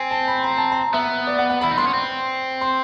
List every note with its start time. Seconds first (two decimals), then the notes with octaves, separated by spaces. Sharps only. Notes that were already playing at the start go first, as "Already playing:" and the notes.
Already playing: C4 G#5
0.11 A5
0.28 B5
0.43 A#5
0.58 A5
0.72 A#5
0.93 B3 E5
1.27 D5
1.39 F#5
1.50 F#5
1.61 E4 B5
1.71 D#4
1.78 D4 C6
1.87 C#4
1.94 C4
2.61 C6